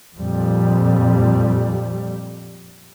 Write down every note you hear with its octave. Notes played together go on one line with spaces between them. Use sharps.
F2 A#2 G3